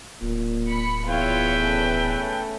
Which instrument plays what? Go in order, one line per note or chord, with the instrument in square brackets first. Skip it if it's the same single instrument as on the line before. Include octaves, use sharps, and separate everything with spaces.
[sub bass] D1 [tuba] A#2
[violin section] B5 C#7
[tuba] E2 [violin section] F4 C#5 [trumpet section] B4 E5 G5
[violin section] A3 C#4